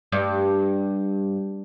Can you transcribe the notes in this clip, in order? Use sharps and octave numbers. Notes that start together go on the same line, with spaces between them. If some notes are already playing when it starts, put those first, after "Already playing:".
G2